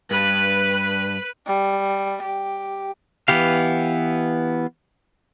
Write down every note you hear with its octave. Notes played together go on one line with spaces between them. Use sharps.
G2 B4
G3
G4
E3 B3 G4 F5